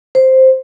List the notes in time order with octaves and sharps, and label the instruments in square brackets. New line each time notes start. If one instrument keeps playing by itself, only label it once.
[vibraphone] C5